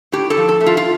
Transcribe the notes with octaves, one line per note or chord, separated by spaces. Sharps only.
A2 G4
A4
F3
A4
A3
F4
F4